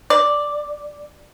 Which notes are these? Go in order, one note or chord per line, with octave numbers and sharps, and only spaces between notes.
D5